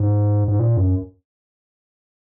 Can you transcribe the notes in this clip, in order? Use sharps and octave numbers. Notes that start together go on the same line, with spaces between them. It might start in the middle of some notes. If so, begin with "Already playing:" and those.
Already playing: G#2
G#2
A#2
F#2